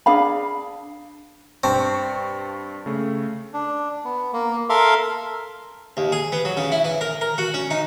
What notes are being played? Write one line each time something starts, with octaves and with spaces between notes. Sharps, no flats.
D4 G#4 F5 B5
G2 C4 A5 C#6
C#3 A3
D4
B3
A#3
A4 A#4 E5 F5 C6
D#2
G#4
B3
F#3
C#3
E4
E3
A#4
A#4
F#4
C#4
D#4